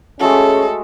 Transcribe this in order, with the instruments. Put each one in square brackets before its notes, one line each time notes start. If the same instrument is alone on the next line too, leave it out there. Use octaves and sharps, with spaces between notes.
[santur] G#3 A3 F#4 [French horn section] C#4 G#4 [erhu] A4